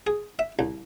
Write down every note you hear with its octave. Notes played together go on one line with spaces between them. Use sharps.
G#4
E5
C2